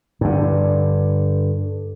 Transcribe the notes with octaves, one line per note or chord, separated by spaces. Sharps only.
G2 D3